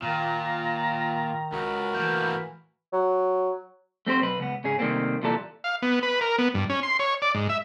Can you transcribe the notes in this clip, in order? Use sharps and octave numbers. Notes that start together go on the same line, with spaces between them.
A#2 D#3 F4 A#5
C#2 F#4 A#4 B5
A2 E3 A#3 G6
F#3
A3 C4 G4 C5
B1 B4
C#2 B3
G#2 C#3 C#4 G#4
C3 D#3 G3 A3 A#3 C4
C2 A#2 E3 G3 A4
F5
B3
B4
A#4
B3
G2
C#4
C6
C#5
D5
G#2
E5